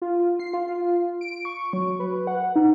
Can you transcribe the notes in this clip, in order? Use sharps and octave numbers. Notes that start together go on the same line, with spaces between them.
F4
C7
F4
D7
C#6
F#3
B4
F#5
D#4